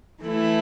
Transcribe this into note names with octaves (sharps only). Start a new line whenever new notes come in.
E3 A3 E4